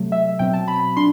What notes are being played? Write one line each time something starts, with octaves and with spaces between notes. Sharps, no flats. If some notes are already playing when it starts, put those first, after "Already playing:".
Already playing: C3 F#3 A3
E5
B2 F#3 C4 G5
A5
B5
D4 C6